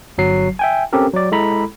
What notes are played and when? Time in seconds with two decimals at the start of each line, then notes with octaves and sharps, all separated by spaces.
0.18 G1 F#3 C7
0.59 E5 G5 G#5
0.93 C4 C#4 G4 A4 A#4
1.13 F#3 D5
1.32 G#3 E4 A4 A#5 B5